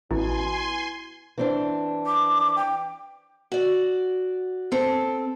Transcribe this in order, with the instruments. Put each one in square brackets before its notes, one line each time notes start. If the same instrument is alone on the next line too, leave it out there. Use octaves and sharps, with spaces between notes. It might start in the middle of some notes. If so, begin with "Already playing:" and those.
[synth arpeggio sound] A1 [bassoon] B2 [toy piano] E4 [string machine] G#5 C6
[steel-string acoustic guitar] E3 C4 D4
[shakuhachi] D6
G5
[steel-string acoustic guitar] F#4 D5
C4 A4